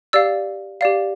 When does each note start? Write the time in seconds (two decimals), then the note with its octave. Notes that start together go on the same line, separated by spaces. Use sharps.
0.13 G4 D5 F5 E6
0.81 G4 D5 F5